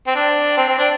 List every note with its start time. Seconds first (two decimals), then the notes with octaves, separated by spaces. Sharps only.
0.07 C4
0.15 D4
0.57 C4
0.68 C4
0.78 D4